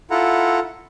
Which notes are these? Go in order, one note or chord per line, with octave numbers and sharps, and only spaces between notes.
E4 F4 A4 F#5 A#5